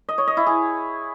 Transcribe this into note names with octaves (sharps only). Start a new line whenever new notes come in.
D#5
C#5
D#5
E4
G#4